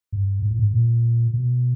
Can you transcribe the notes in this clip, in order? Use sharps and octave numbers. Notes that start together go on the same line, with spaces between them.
G2
G#2
A2
G#2
A#2
B2